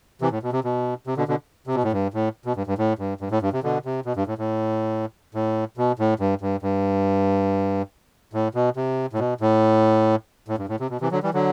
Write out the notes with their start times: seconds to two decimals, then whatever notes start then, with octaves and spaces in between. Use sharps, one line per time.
0.21 C3 E3
0.31 A2
0.43 B2
0.53 C3
0.64 B2
1.07 C3
1.17 B2 D3
1.28 B2 D3
1.67 C3
1.75 B2
1.84 A2
1.93 G2
2.14 A2
2.45 B2
2.56 G2
2.67 G2
2.78 A2
2.99 G2
3.21 G2
3.31 A2
3.42 G2
3.53 C3
3.63 B2 D3
3.85 C3
4.06 B2
4.16 G2
4.27 A2
4.38 A2
5.35 A2
5.77 B2
5.99 A2
6.20 G2
6.41 G2
6.62 G2
8.33 A2
8.55 B2
8.76 C3
9.13 A2
9.19 B2
9.41 A2
10.48 A2
10.58 G2
10.69 A2
10.80 C3
10.90 B2
11.01 C3 E3
11.11 D3 F#3
11.22 E3 G3
11.34 D3 F#3